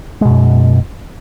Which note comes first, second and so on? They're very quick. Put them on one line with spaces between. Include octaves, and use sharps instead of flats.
G#3 B2 F#2